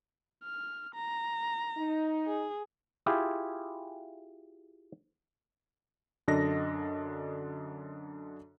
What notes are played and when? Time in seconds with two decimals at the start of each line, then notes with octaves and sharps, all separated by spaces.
0.44 F6
0.95 A#5
1.77 D#4
2.27 G#4
3.06 E4 F4 G4 G#4
6.28 F#2 D3 D4 A4 D#5 A#6